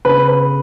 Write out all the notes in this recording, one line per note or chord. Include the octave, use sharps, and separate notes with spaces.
C#3 B4
B4